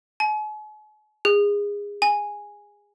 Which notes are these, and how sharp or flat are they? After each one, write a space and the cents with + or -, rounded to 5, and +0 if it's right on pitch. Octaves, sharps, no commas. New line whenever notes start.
G#5 +45
G#4 -25
G#5 -5